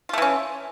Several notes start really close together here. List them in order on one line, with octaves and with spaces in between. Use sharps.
F4 A3 E3 C#4